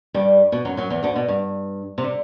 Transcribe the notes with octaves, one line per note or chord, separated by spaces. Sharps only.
G2 G3
B2
F#2 F#3
F#2 F#3
E2 E3
D2 D3
B2
G2
C3
D3